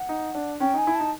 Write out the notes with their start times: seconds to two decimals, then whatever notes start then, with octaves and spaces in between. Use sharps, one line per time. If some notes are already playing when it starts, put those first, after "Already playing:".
Already playing: F#5
0.09 D#4
0.35 D4
0.60 C#4 G5
0.74 D#4
0.78 G#5
0.87 E4
0.95 D#4 A5